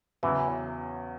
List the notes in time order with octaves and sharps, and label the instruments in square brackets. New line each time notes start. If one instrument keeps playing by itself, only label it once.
[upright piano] E2 C#3 F#3 [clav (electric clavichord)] E3